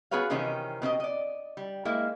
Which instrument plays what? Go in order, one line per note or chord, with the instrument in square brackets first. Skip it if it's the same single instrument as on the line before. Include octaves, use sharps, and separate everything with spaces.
[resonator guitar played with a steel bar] B3 F#4 G#4 B4 C#5 F5
C3 D#3 E3 C4 C#4 D#4
B2 C4 G4 D#5
D5 D#5
G3
G#3 A#3 E4